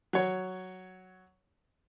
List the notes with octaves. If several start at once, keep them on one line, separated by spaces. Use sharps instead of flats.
F#3 C#5